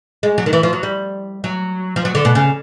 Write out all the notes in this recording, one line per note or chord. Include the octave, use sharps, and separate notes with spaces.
G#3
F#3
D#3
E3
F3
F#3
G3
F#3
F3
F#3
D3
B2
C#3